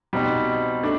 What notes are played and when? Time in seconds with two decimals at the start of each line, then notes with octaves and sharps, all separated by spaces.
0.13 B2 G3 C4 D#4
0.83 A3 D4